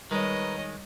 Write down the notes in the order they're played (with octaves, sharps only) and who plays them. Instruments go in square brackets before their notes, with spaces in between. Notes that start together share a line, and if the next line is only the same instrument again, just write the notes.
[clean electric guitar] D#3 G#3 [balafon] G3 [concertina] A#4 B4 [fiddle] C#5 D#5